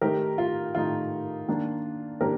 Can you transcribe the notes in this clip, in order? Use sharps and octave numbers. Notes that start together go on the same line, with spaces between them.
D#3 A3 D#4 G4 A#4
F4
D#3 A3 D#4 F4
D#3 A#3 D4
D#3 A#3 D4 G4 A#4